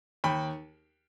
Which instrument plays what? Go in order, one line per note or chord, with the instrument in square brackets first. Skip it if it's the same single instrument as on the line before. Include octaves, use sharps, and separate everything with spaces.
[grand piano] D#2 G5 B5